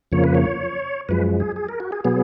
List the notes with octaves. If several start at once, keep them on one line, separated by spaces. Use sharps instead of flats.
F2 C#3 F3 A#3 C#5
B4
C#5
F#2 F3 G#3 B4
G#4
G#4
A#4
F#4
G#4
B2 F#3 B3 G#4